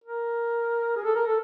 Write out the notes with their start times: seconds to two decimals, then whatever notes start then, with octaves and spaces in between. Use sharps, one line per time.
0.04 A#4
0.96 G#4
1.04 A4
1.15 A#4
1.27 A4